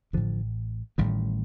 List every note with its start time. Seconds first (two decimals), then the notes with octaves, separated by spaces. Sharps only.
0.13 A1 A2 D3 F3
0.98 A1 A2 D#3 G3